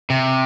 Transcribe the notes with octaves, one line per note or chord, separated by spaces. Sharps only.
C3